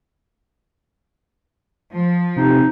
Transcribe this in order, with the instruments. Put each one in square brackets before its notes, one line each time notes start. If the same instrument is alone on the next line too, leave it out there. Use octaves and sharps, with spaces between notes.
[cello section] F3
[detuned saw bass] C3 [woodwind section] C4 D#4